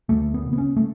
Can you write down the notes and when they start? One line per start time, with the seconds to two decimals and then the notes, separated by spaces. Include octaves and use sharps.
0.09 D2 A3
0.34 B3
0.46 C#3
0.53 B3
0.58 C#4
0.77 A3